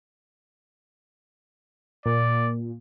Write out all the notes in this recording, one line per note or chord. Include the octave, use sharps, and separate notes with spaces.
A#2 D5